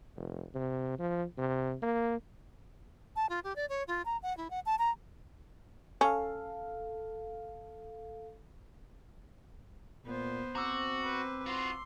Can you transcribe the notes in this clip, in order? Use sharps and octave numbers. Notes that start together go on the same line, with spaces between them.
F1
C3
F3
C3
A#3
A5
F4
G4
D5
C#5
F4
A#5
F#5
E4
F#5
A5
A#5
C#4 A4 F5
A#2 B3 C5
C4 F#4 A#5 D6 E6
B4 C5
F4 F#4 C6